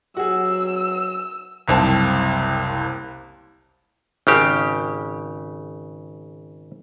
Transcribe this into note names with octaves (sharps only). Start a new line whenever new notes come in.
F#3 F#4 G#4 E6
F#1 C2 C4 A5
G#1 C#3 G4